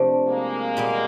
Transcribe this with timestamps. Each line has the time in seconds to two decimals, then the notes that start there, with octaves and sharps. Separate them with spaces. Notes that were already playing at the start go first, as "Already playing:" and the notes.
Already playing: C3 F3 A3 D4
0.29 G#3 A#3
0.77 A#2 G3 B3